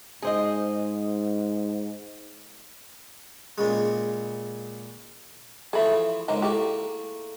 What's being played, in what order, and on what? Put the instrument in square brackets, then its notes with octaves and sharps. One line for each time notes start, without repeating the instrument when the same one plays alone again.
[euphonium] G#2 [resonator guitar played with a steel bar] G#4 C5 D#5
[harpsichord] A#2 C#3 G#3
[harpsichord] E3 F3 A3 [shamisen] G#4 B5 [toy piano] A4 E5
[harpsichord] C#2 G#3 A#3 [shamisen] D#4 A#4 C5
[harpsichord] A3 A#3 [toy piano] E4 G#4 [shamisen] G4